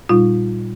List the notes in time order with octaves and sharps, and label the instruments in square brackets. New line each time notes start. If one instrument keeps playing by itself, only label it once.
[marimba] A#2 G3 D#4 F4